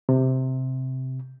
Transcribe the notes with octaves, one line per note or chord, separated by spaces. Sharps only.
C3